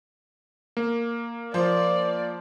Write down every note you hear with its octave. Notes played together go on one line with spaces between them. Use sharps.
A#3
F3 D5